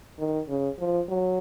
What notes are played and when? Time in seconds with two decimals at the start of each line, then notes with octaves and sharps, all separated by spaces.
0.19 D#3
0.48 C#3
0.79 F3
1.09 F#3